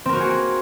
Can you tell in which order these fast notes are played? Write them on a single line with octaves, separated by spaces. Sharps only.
C4 A#4 F#4 A#3 G#4